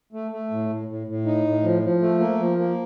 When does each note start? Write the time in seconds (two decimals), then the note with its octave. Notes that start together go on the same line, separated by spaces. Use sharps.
0.13 A3
0.31 A3
0.51 A2
0.69 A2
0.88 A2
1.07 A2
1.26 D#4
1.45 A2
1.63 F3
1.82 F3
2.01 A3
2.19 A#3
2.39 F3
2.58 A#3